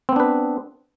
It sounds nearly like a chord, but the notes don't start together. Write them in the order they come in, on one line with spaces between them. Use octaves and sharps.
C4 B3 D4 B4